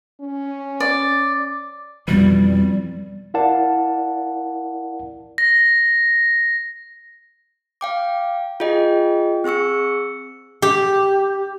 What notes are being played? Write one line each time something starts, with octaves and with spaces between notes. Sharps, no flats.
C#4
D5
F2 B2 E3 G3
E4 A#4 D5 F5 F#5 A5
A#6
F5 G5 D6
F4 G#4 D#5 G5
C4 G#4 C#6 E6 C#7
G4